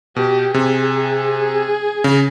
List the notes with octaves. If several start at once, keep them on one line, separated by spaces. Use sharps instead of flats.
B2 G4
C3 G#4
C#3